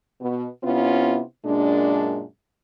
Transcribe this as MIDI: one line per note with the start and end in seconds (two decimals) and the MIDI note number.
0.21 0.47 47
0.63 1.20 48
0.63 1.20 59
0.63 1.20 61
0.63 1.20 64
0.63 1.20 65
1.45 2.24 42
1.45 2.24 46
1.45 2.24 56
1.45 2.24 62